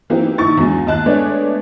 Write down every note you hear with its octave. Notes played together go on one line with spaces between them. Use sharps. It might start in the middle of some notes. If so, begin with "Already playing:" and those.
E3 F#3 A#3 C4 D#4 G4
A#1 D#3 D#4 C#6 A6
E2 G2 F#3 G#3
D#2 D#5 A5 F#6
G#3 A3 B3 D4 C#5 D5